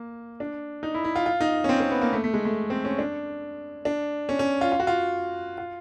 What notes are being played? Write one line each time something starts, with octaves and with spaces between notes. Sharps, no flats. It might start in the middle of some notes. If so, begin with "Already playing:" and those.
Already playing: A#3
D4
D#4
E4
E4
F4
F4
D#4
C#4
C4
C4
B3
A#3
A3
A3
G#3
A3
C4
C#4
D4
D4
C#4
C#4
F4
F4
F#4
F4
F4